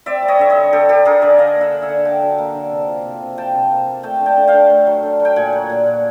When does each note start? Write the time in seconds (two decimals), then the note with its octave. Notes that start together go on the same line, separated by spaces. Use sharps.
0.06 C4 D5 E5
0.22 G3
0.28 C#5 D#5
0.39 D3 E5
0.50 C#5 D#5
0.56 G3
0.72 D3 G4 A4
0.89 D3 G4 A4
1.05 D3 G#4 A#4
1.22 D3 D5 E5
1.38 D3 D#5 F5
1.55 A#3
1.61 E5 F#5
1.72 D3
1.82 E5 F#5
1.89 D3
2.05 D3 G5 A5
2.22 F#3
2.38 A#3
2.54 D3
2.71 C3
2.88 F3
3.05 C3
3.22 C3
3.37 F3 G5 A5
3.55 C3
3.71 A#3
3.87 A#3
4.03 A3 G5 A5
4.20 D3
4.26 G5 A5
4.37 D3
4.47 F5 G5
4.53 D3
4.70 A3
4.87 F#3
5.03 D3
5.20 F#3
5.25 G5
5.36 A#2 F#5 G#5
5.53 F#3
5.70 A#2
5.86 A#2